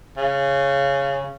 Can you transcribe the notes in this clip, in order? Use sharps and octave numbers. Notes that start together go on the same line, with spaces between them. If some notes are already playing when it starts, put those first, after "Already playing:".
C#3